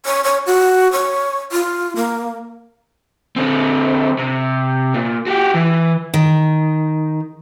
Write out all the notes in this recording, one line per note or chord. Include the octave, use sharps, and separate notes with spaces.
C#5
C#5
F#4
C#5
F4
A#3
D3 C4
C3
A#2
F#4 G4
E3
D#3